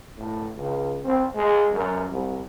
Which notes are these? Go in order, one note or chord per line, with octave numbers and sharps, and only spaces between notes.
A2
C#2
C4
G#3
F#2
C2